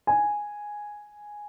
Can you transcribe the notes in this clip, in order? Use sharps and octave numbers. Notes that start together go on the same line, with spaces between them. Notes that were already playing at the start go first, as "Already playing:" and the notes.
G#5